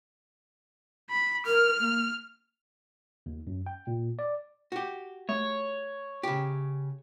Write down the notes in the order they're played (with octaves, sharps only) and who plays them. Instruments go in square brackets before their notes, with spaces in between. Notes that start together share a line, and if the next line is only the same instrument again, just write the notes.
[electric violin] B5
[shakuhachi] A#4 [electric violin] F6
[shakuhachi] A#3
[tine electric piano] D#2
F#2
G5
A#2
D5
[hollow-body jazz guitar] F#4 G4
[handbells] A3 [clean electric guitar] C#5
[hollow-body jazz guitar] C#3 G4